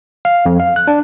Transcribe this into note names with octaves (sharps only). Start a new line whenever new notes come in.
F5
F2
F5
F#6
D4